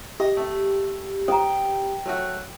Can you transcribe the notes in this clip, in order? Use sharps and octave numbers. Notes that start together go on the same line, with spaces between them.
G4 D#5
A3
G5 A#5 D#6
F#3 A3 F#4